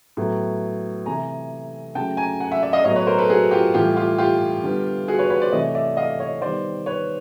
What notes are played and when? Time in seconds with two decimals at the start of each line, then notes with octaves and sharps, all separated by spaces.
0.17 A2 F#3 B3
1.06 C3 E3 A3 G#5 A#5
1.95 C#3 F#3 A3 G5 A5
2.17 G#5 A#5
2.40 F#5 G#5
2.52 E5 F#5
2.63 D5 E5
2.73 D#5 F5
2.85 A2 F#3 B3 C#5 D#5
2.96 B4 C#5
3.07 A#4 C5
3.18 A4 B4
3.30 F#4 G#4
3.51 F4 G4
3.74 A2 E3 G3 F4 G4
3.96 F4 G4
4.18 F4 G4
4.63 D3 G3 B3
5.08 F#4 G#4
5.19 B4 C#5
5.30 B4 C#5
5.42 C5 D5
5.52 C3 E3 A3 C#5 D#5
5.75 D5 E5
5.97 D#5 F5
6.20 C#5 D#5
6.42 D#3 G3 B3 C5 D5
6.86 B4 C#5